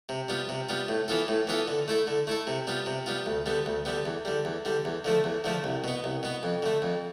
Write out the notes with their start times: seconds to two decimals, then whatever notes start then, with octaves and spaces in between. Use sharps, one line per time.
0.09 C3
0.28 G3 B3 F4
0.49 C3
0.69 G3 B3 F4
0.88 A2
1.08 E3 B3 F4 A4
1.28 A2
1.47 E3 B3 F4 A4
1.68 D3
1.88 A3 E4 A4
2.07 D3
2.27 A3 E4 A4
2.47 C3
2.67 G3 B3 F4
2.86 C3
3.06 G3 B3 F4
3.26 D2
3.46 D3 G3 B3
3.66 D2
3.85 D3 G3 B3
4.06 E2
4.25 D3 G3
4.45 E2
4.65 D3 G3
4.85 E2
5.04 D3 F3 A3
5.24 E2
5.44 D3 F3 A3
5.64 C2
5.84 B2 B3
6.04 C2
6.23 B2 B3
6.43 F2
6.62 D3 A3
6.82 F2